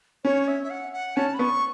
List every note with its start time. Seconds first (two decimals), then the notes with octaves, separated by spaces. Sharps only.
0.24 C#4 C#5
0.48 E5
0.63 E5
0.70 F#5
0.93 F#5
1.16 C#4 A5
1.34 B5
1.39 B3 C#6